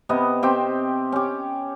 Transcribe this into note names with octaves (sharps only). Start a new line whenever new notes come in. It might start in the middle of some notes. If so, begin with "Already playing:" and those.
C3 B3 D#5
C4 G4 G5
C#4 G4